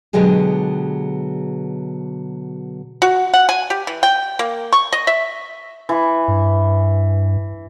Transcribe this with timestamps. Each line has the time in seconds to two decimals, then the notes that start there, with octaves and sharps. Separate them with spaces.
0.13 B2 D3 F#3 G#3 G4 G#4
3.02 F#4
3.34 F#5
3.49 G#5
3.70 G4
3.87 E3
4.03 G5
4.39 A#3
4.73 C#6
4.92 D#5
5.07 E5
5.89 E3
6.28 G2